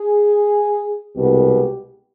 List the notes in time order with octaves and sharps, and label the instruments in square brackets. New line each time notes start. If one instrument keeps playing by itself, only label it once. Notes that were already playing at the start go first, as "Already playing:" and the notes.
Already playing: [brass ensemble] G#4
C2 B2 G#3 B3 G4